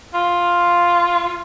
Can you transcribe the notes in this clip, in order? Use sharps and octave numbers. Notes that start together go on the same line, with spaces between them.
F4